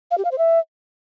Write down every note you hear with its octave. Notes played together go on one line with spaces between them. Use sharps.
F5
G4
F5
C5
E5